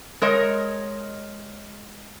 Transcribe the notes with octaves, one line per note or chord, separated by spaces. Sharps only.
G#3 A#4 C#5 D#5